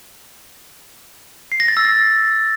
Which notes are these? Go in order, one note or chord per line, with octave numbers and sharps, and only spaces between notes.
C7
A#6
A6
E6
A6